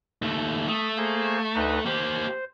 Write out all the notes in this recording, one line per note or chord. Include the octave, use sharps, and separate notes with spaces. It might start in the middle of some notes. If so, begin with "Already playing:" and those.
D#2 A3
A3 D#6
A#3 G#4 C5
D2 D#4 B4
A#3 G4 C5